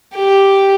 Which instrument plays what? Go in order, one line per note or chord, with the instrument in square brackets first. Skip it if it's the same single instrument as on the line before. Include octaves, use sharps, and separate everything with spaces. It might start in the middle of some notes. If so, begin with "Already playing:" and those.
[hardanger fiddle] G4